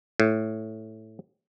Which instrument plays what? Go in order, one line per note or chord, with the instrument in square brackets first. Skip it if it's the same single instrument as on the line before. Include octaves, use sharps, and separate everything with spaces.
[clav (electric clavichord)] A2